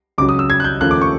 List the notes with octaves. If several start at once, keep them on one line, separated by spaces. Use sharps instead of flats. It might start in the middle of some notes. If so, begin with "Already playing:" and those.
C#2 C#3 F#3 D6
D#6
E6
G#6
F#6
G6
D#2 C#3 F3 A3 F#6
D6
C#6